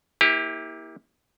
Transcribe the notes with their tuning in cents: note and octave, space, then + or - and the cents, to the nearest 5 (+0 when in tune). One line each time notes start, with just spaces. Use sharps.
A#3 +15 E4 -25 G4 +30